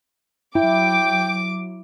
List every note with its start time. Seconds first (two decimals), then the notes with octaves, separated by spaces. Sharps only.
0.55 F#3 E4 G5 D6